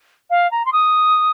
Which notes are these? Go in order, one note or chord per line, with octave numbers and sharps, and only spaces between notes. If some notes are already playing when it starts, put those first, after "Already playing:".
F5
A#5
C6
D#6